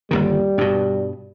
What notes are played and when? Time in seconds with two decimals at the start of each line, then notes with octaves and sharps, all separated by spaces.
0.11 G1 D#2 D#3 G3
0.58 G2 B2